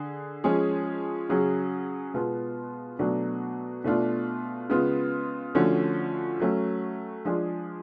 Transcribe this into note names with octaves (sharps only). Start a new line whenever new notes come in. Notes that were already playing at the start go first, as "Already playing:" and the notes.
Already playing: D3 G#4
F3 G#3 C#4 G#4
C#3 F#3 C#4 G#4
B2 G#3 B3 F4
B2 F#3 A3 D4 F#4
B2 A3 D4 F4
C#3 G#3 B3 F4
D3 F3 A3 C#4 F#4
F#3 A3 C#4
F3 G#3 D4 F4 G#4